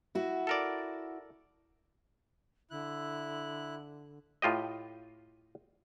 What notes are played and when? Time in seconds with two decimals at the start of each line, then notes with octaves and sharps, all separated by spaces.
0.15 E4 F#4
0.47 A4 A#4 D5
2.71 D3 E4 F#6
4.42 A2 F4 G4 D#5